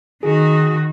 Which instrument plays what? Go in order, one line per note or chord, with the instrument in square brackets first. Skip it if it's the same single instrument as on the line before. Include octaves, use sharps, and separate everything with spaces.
[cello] D#3 F#4 [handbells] G#4